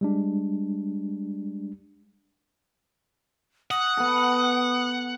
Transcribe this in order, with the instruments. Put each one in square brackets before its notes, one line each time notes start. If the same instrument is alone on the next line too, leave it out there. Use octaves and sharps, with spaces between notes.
[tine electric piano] G3 G#3 D4
[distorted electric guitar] F#5 [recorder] D#6
[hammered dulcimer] B3 A4